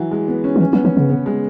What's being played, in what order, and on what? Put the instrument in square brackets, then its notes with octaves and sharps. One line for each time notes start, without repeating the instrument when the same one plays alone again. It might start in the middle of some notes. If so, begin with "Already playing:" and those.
Already playing: [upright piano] E3 F#3
G#3
B3
C#4
[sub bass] F#3
[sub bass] E3 [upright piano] C#4
[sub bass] F#3 [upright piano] B3
[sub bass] E3 [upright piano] C#4
[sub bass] C#3 [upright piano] B3
[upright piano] B3
G#3